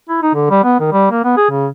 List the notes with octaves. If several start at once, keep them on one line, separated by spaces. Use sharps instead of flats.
E4
D#4
D3
G3
B3
D#3
G3
A#3
B3
G#4
C#3